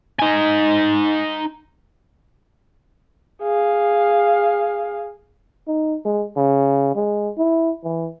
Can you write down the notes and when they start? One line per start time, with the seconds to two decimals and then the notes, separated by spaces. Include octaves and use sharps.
0.20 D#4 G#5
3.42 G#4 F5
5.67 D#4
6.05 G#3
6.37 C#3
6.95 G#3
7.38 E4
7.84 E3